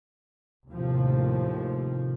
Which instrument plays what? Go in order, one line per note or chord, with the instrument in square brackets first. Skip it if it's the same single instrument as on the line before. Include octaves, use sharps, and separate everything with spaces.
[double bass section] D#2 A2 C3 F3